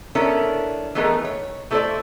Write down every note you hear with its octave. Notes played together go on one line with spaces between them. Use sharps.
B3 C#4 D4 E4 A4 A#4
E3 A3 B3 D#4 G#4 A#4
C#5
A3 E4 A4 B4 C5 D5